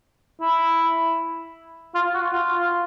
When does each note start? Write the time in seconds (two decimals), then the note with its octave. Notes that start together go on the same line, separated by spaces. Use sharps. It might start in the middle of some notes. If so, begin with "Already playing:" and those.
0.41 E4
1.95 F4
2.14 F#4
2.33 F4